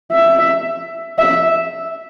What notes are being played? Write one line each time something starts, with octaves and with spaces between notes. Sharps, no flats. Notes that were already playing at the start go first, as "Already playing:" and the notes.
E5
E5